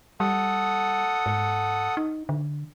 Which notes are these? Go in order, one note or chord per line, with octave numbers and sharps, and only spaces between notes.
G3 A4 F#5 D#6
G#2
D#4
D3